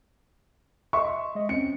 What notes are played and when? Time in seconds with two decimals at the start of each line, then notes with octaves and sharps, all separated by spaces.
0.93 D#5 E5 C6 C#6
1.35 G#3 D#5
1.49 C4 C#4 C#7